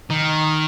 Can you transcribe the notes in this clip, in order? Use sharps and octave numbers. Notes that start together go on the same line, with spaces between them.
D#3